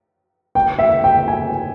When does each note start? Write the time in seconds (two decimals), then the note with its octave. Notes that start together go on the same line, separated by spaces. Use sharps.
0.55 G5
0.79 E5
1.04 G5
1.28 G#5